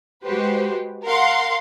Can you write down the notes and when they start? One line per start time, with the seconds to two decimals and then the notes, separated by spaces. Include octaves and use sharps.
0.23 G#3 F#4 G4 B4 C5
1.04 A#4 F5 F#5 C6